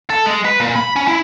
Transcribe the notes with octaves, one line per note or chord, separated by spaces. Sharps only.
A4
G#3
B4
A#2
B5
C#4
E4